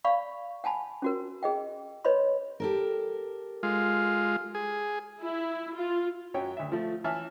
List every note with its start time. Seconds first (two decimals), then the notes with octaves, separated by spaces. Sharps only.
0.05 D5 F5 B5 C#6
0.64 F#5 G#5 A5 B5
1.02 C#4 F#4 A#4
1.43 G#4 D#5 G5
2.05 B4 C#5 D#5 B5 C6
2.60 G4 A4 A#4
3.63 G#3 F4
4.55 G#4
5.22 E4
5.74 F4
6.34 F#2 F#3 C#5 G5
6.57 D2 E5
6.72 F3 A3
7.04 E3 C#4 E5 A5 F6